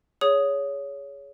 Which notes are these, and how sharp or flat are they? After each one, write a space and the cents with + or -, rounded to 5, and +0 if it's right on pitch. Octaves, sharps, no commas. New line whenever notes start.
G#4 +0 C#5 +20 D#6 +0